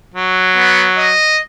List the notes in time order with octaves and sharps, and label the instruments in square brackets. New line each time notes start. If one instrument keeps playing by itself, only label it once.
[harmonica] F#3
[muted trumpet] B3
D#5